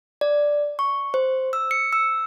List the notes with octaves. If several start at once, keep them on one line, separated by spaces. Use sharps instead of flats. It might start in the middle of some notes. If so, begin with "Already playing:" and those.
D5
C#6
C5
E6
C#7
E6